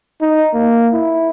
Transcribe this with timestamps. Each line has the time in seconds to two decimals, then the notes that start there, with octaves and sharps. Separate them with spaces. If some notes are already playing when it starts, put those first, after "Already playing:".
0.21 D#4
0.54 A#3
0.93 E4